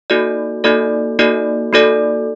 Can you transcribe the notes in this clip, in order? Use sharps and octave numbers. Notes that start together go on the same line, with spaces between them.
A#3 D#4 F#4 A4 D5
A#3 D#4 F#4 A4 D5
A#3 D#4 F#4 A4 D5
A#3 D#4 F#4 A4 D5